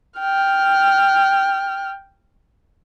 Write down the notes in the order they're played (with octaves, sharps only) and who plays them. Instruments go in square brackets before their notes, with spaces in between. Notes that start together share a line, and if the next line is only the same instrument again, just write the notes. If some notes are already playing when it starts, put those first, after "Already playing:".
[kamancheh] G5 F6